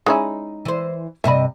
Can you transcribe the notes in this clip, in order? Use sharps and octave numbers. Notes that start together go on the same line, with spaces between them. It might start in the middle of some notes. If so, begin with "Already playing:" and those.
G#3 C#4 D#4 E4
E3 C5
G2 C3 D#5 E5 B5